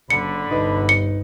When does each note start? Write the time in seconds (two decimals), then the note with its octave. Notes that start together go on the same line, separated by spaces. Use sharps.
0.10 F#1 D3 B5 C#7
0.51 G1 C2 D#4 B4
0.89 C#7